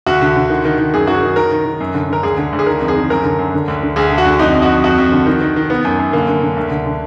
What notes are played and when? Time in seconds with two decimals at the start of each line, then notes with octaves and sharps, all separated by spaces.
0.06 D2 F#4
0.21 D3
0.36 D3
0.50 D#3
0.65 D#3
0.78 D#3
0.94 F#2 G#4
1.07 D#3 F#4
1.15 G#4
1.22 D#3
1.36 D#3 A#4
1.52 D#3
1.65 D#3
1.80 F#2
1.94 D3
2.09 D3 A#4
2.23 D2 G#4
2.38 D3
2.53 D2
2.59 G#4
2.66 D#3 A#4
2.80 F2
2.88 G#4
2.95 D#3
3.10 F#2 A#4
3.25 D3
3.39 F#2
3.54 D3
3.68 D2
3.83 D3
3.96 D2 G#4
4.11 D3
4.18 F#4
4.25 D2
4.39 F2 D#4
4.54 F2
4.62 F#4
4.69 F2
4.83 F2 F#4
4.98 F2
5.12 D3
5.26 D#3
5.41 D#3
5.56 D#3
5.70 D#3 B3
5.84 F#2
5.99 F#2
6.13 D3 A#3
6.28 D3
6.42 D3
6.57 D2
6.71 D3
6.86 D3